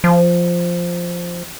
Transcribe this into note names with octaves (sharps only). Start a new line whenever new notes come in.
F3